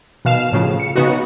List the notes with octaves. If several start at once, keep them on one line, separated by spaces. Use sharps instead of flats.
B2 D#3 F5 E7
A2 C#3 F3
C#7
C#3 B3 D#4 F#4